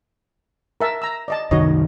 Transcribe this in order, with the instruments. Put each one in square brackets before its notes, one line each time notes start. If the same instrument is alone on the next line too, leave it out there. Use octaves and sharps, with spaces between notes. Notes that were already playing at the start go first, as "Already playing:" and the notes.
[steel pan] A#4 E5 A5
A#5 E6
D5 D#5 A5
[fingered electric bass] C2 F#2 D#3 [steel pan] F#4 C#5 D#5